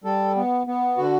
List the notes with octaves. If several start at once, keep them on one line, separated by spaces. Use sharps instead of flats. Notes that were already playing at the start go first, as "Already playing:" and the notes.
G3 A4
B3
B3
D3 F#4